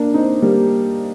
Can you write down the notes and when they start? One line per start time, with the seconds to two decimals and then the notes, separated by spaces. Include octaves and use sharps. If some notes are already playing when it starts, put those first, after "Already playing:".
Already playing: A#3 D4
0.14 C4 D#4
0.42 G3 A#3